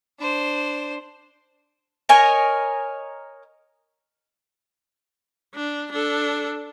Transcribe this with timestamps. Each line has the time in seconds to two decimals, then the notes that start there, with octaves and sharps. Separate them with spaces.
0.19 D4 C5
2.09 A#4 C#5 D#5 G#5
5.55 D4
5.92 D4 A4